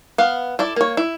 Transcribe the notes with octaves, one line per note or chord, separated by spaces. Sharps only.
B3 F5
E4 A4 D5
A#3 C#5
E4